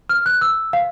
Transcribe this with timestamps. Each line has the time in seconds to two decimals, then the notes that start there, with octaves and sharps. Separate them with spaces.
0.09 F6
0.26 F#6
0.41 E6
0.73 F5